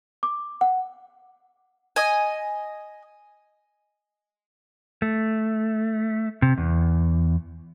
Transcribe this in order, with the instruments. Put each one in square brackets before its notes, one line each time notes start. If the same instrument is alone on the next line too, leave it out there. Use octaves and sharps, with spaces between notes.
[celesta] D6
F#5
[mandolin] D#5 G#5
[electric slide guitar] A3
C3
E2